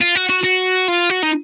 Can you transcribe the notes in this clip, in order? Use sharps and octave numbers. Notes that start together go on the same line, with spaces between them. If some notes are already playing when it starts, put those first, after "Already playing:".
F4
F#4
F#4
F#4
F4
F#4
D#4